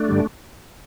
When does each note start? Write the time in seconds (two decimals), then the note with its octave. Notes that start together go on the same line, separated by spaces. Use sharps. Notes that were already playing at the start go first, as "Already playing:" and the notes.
Already playing: A3 D4
0.09 G2 D3 G3